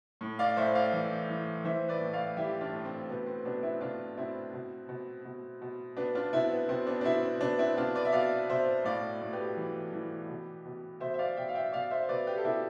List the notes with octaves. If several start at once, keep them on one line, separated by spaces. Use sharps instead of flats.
A2
D5 F5
A2 C5 E5
D5 F5
E3
E3
E3 C5 E5
B4 D5
A2
D5 F5
E3 E4 G4
D4 F4
A2
C4
B2 B3
C4
B2 B3 D4
C4 E4
B2 D4 F4
B2 C4 E4
B2
B2
B2
B2
B2 B3 D4
D4 F4
B2 C4 E4
B3
B2 C4
B3 D4
D4
B2 C4 E4
C4
B2 B3 D4
C4 E4
B2 D4 F4
B4 D5
E5
B2 D5 F5
B2 C5 E5
A2 D5 F5
A2
G4 B4
E3
E3
B2
B2
B2 C5 E5
E5
D5 F5
B2 E5 G5
F5
E5 G5
B2 D5 F5
C5 E5
E5
B2 B4 D5
G4 B4
A4
B2 E4 G4